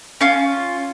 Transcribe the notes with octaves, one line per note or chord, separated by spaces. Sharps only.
C#4 F4